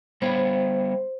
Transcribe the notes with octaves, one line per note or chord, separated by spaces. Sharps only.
G3 B3 C5 C#5